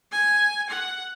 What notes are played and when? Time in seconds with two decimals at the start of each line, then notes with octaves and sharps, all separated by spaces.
0.12 G#5
0.69 F#5